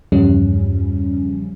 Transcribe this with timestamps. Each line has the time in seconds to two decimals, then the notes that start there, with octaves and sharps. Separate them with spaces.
0.12 E2 G2 C#3 F3 G3 C#4